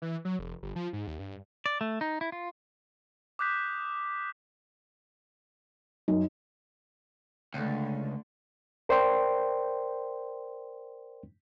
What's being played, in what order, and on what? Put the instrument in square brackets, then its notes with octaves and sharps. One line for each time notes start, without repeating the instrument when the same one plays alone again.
[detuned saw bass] E3
F#3
F1
G1
F3
G#2
D#2
G2
[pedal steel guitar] D5
A3
D#4
E4
F4
[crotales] D6 D#6 F#6 G6 B6
[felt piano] F#2 [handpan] D#4
[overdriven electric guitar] C#2 [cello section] D3 A3
[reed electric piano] A#4 C5 D5 G5 C6